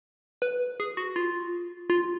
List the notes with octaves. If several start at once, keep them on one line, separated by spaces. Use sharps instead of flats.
B4
G#4
F#4
F4
F4